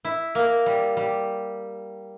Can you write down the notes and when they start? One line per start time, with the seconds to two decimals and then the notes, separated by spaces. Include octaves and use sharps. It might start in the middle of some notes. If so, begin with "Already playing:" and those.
0.05 E4
0.35 A#3
0.66 G3
0.97 G3